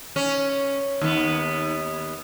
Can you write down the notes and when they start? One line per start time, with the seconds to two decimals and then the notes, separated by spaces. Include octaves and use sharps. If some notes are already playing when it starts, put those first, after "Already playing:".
0.16 C#4
1.01 D#2 B3